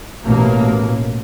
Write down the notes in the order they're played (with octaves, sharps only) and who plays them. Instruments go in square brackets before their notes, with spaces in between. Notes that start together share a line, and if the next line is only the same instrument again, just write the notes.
[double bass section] A1 B2 A#3